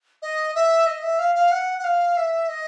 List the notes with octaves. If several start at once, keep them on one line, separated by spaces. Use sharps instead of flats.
D#5
E5
D#5
E5
F5
F5
F#5
F#5
F5
E5
D#5